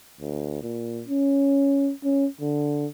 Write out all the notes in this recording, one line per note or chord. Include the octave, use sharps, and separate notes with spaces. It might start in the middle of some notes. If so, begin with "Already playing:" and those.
D2
A#2
C#4
C#4
D3